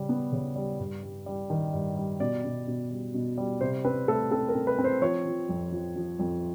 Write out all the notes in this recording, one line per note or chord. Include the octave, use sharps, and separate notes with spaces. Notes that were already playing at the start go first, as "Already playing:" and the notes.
Already playing: C#3 G3
B3
C#3
G3
G2
G3
G3
D#3
G2
G3
B2 D5
B2
B2
G3
B2
G3
C3 C5
C4 B4
A3 A4
C4 A4
A#4
C4
B4
C4
C5
F3 C#5
F3
F2
F3
F3
F2